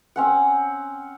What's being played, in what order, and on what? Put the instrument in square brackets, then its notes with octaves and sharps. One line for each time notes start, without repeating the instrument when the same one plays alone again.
[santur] C4 C#4 F#5